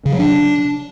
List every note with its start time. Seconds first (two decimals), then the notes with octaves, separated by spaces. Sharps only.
0.06 C#3
0.12 F#3
0.19 D4